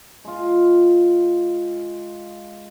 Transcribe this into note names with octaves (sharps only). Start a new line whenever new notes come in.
G#3 F4